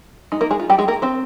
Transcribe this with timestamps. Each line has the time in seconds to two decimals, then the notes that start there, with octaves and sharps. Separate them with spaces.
0.32 G#3 D#4
0.41 A#3 A#4
0.51 G#3 G#4
0.60 F4
0.70 G3 G4
0.78 G#3 G#4
0.88 A#3 A#4
1.02 C4 C5